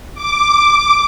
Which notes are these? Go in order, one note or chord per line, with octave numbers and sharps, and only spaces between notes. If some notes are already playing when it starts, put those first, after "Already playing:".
D6